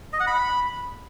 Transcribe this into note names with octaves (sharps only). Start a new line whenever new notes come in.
D#5
F#5
B5